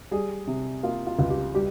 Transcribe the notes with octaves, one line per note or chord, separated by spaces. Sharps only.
G3 G#4
C3
A#3 F4
F4
C#2 F4
G4
G3 G4